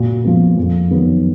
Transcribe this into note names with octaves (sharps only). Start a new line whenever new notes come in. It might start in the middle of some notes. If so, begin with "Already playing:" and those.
Already playing: A#2 F#4
F3 B3
F2
D#3 F#3 B3